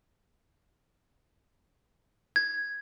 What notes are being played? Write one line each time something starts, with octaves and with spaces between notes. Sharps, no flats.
G#6